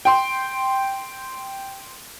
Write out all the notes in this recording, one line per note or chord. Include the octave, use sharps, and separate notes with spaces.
G5 C6